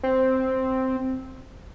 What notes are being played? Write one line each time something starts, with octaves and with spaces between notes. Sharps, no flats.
C4